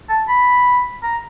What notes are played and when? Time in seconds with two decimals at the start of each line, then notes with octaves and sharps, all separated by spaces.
0.09 A5
0.28 B5
1.03 A#5